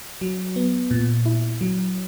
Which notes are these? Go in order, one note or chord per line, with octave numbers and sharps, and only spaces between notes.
F#3
B3
A#2
E4
F#3